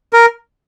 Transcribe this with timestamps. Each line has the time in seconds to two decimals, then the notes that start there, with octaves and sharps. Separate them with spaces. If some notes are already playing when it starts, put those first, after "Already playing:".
0.13 A#4